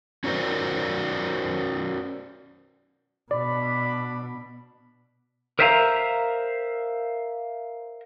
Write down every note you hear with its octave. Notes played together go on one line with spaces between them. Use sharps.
C#4 D4 F#4 A#4 C5 D5
B2 D4 D5 B5
A#4 C5 E5 F5 G#5 A#5